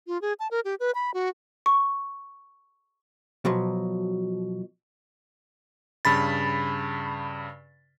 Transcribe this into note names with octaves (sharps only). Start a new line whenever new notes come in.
F4
G#4
A5
A#4
G4
B4
B5
F#4
C#6
B2 F3 F#3
G2 C#3 B5 A6